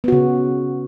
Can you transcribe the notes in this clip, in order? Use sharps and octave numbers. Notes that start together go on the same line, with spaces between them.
C#3 B3 F#4